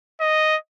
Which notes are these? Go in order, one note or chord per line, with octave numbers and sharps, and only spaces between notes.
D#5